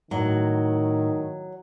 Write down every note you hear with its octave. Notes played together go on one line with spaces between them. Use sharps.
A2 D#3 F#3